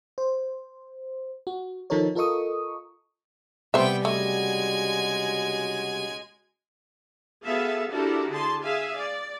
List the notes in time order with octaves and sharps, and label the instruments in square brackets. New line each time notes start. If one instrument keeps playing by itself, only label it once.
[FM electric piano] C5
F#4
D#3 F3 D#4 A4 A#4 C#5
F4 A4 A#4 D#5 C#6 D#6
[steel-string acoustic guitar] C3 G3 [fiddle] B3 G5 [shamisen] C5 E5
[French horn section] D#2 C#3 F#4 [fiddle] G#3 G#5 [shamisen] A3
[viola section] B3 F#4 G#4 A4 E5 F5
D4 E4 F#4 G4 A4 A#4
D3 G#4 A5 C6
G#4 E5 F5 G#5
D5